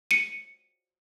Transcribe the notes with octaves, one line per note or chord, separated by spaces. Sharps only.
C#7 D#7